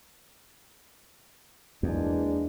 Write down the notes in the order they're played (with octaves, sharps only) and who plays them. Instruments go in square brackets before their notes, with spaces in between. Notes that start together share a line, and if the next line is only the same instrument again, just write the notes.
[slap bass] E2 [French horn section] G#3 A#3 D4